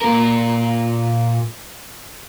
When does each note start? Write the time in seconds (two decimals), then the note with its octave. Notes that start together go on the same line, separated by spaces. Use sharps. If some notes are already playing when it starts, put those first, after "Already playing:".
0.02 A#2 A#4